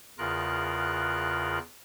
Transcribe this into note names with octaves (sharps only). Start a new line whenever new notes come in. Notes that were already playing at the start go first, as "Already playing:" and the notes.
E2 C#3 F4 A#4 F#6